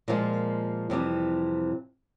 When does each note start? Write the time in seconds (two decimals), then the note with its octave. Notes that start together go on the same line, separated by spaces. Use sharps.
0.08 A#2 F3 G#3 A#3
0.90 F2 C3 E3 G3